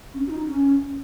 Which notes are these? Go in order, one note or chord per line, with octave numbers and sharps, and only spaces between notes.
C#4
F#4
D#4
C#4